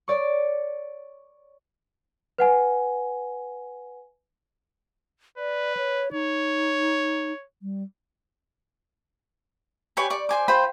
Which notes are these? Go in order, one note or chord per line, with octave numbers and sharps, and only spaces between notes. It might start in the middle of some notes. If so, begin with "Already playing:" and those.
C#5 D5 C#6
B4 F#5 G#5
B4 D5
C#5
D#4 C#5
G3
G4 B4 C#5 G#5
D5 C#6
C5 G#5 D6
F4 C5 G5 B5